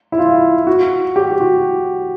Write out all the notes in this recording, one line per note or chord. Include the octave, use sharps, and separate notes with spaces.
E4
F4
F#4
G4
F#4